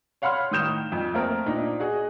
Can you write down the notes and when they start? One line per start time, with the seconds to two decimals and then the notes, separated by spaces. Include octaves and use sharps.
0.22 C#5 F5 F#5 B5 C6 F6
0.51 A2 D#3 D#6 G6 E7
0.92 F2
1.14 A3 A#3 C4 A#4
1.46 A#2 D4 D#4
1.80 F#4 G#4 D#5